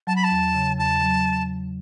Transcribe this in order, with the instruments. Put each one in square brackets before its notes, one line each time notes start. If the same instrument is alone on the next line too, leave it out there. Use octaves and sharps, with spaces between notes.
[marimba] F#3 [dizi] A5
[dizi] B5
A5
[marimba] E2
C#3
[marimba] E2 [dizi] A5
[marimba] F#3